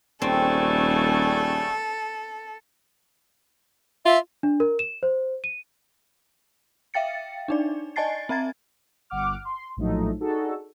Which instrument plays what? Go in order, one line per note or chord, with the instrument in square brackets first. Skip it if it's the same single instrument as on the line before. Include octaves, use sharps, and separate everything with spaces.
[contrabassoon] D#1 [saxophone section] C#3 G3 A3 [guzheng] C4 [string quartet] A4
[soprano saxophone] F4 [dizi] E5
[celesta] D4
A#4
E7
C5
D#7
[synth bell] E5 F5 G5 A6 C#7
D4 D#4 D5
D5 D#5 G#5 A5 A6 C7
C4 E5 A#5 G#6 A6
[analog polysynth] G1 F#5 D6 F6
C6
A#1 A2 F3 F#3 A3 D#4
D4 D#4 F#4 G#4 A4